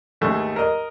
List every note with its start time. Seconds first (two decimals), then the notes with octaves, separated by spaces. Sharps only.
0.21 D#2 G#2 A3 D#4
0.56 A#4 D#5